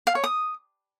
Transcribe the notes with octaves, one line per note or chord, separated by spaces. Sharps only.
F5
C#5
D#6